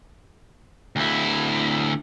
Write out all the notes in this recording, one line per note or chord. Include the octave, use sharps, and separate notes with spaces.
D2 E4